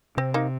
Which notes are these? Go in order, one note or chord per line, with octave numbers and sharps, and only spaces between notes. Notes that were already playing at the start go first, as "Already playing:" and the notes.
C3 C4
A#3 D#4